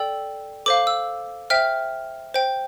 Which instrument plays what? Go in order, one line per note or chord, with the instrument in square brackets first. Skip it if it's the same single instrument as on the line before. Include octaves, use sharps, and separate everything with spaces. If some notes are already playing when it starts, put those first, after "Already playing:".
Already playing: [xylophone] A4 D5 G5 E6
A4 C5 F5 D6
E6
C5 E5 G5 F6
C5 G5